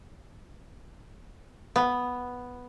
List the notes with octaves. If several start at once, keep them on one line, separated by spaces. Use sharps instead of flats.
B3